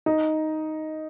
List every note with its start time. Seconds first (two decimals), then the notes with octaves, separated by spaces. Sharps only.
0.06 D#4